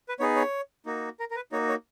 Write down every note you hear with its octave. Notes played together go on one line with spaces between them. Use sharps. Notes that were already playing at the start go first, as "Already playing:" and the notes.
B4
B3 D#4 G#4 C#5
C#5
A#3 D#4 F#4
A#4
A#4
B4
A#3 D#4 F#4 C#5
C#5